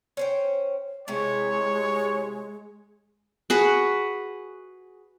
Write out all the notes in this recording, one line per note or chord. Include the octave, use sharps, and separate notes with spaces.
C#4 C5 G5
C3 G#3 E4 C#5
F#4 G#4 B4